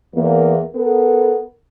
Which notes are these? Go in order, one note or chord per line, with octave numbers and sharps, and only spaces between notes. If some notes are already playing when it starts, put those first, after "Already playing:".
E2 A#3
B3 A4 A#4